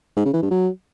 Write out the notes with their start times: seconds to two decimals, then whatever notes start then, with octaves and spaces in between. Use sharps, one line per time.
0.16 G#2
0.25 C#3
0.34 E3
0.42 G2
0.51 F#3